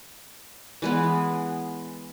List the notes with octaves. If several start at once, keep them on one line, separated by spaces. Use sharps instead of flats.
E3 G#3 B3